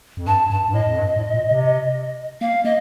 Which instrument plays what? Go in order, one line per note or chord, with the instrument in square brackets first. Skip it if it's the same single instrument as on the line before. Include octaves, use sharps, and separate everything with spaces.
[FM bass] F2
[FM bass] G2 [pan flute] A5
[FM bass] G2 [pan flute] A5
[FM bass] G2
[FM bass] A2 [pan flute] D#5
[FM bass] F2
G2
A2
A#2
C3
[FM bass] A#3 [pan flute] F5
[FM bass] A#3 [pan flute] D#5